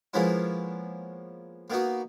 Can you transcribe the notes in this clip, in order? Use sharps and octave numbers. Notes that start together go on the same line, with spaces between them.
F3 G#3 A#3 B3 C#4 E4
A#3 B3 D#4 F#4